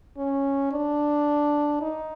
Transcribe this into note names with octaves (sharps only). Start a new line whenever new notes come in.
C#4
D4
D#4